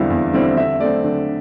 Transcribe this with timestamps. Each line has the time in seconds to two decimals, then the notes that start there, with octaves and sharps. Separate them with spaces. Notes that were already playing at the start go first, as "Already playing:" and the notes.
Already playing: E2 D3 G3 C4 E4 F5
0.10 E2
0.33 D3 G3 C4 E4
0.57 D3 E5
0.80 A3 C4 D5
1.04 D3